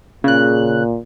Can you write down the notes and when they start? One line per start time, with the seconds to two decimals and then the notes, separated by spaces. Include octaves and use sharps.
0.24 A#2 C#3 F#6